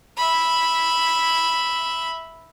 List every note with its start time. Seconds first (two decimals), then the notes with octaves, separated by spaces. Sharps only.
0.18 E5 B5